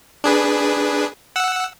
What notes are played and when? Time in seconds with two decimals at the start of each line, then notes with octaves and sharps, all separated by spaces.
0.24 D4 G#4 B4
1.36 F#5 E6